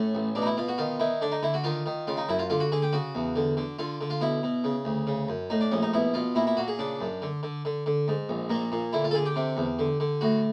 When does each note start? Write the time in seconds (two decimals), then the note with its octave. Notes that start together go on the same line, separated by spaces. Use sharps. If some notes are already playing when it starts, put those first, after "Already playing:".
Already playing: A2 C#4
0.15 A1
0.35 B2 D4
0.42 D#4
0.46 E4
0.57 B2 F4
0.68 F#4
0.78 D#3 F4
1.00 D#3 E4
1.21 D3 D4
1.32 D#4
1.43 D3 E4
1.54 F#4
1.64 D#3 F4
1.86 D#3
2.07 C#3 F4
2.17 D#4
2.29 F#2 E4
2.39 F4
2.50 D3 F4
2.60 F#4
2.72 D3 G#4
2.82 G4
2.93 C#3 F#4
3.15 E2
3.36 D3
3.57 D3
3.79 D3 F4
4.01 D3
4.10 F4
4.21 B2 E4
4.43 B2
4.64 C#3
4.85 D2
5.07 C#3
5.28 F#2
5.50 A2 D#4
5.61 D4
5.72 A#1 C#4
5.83 D#4
5.94 B2 E4
6.14 B2 F4
6.35 A#2 E4
6.47 E4
6.57 A#2 F#4
6.68 G#4
6.79 C#3 D4
7.00 F#2
7.22 D3
7.43 D3
7.65 D3
7.86 D3
8.08 G#2
8.29 A#1
8.50 A#2 A#3
8.72 A#2
8.93 D3 E4
9.04 F4
9.11 A4
9.14 D3 G#4
9.26 G4
9.36 C3
9.57 E2
9.79 D3
10.00 D3
10.21 A2 F#4